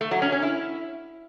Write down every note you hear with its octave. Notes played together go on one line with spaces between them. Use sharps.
A3
F#3
C#4
C#4
E4